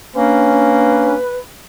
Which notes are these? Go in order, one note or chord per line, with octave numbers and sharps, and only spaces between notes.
A#3 C#4 D4 B4